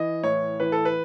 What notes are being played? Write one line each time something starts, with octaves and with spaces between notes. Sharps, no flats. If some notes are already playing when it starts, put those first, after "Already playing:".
Already playing: E3 D#5
A2 C#5
E3 B4
A4
B4